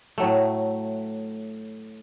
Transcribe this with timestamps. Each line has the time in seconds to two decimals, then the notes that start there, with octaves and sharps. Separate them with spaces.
0.18 A2 F#3 A3